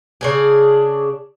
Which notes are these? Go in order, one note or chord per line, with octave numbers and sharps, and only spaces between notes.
C#3 D4 G#4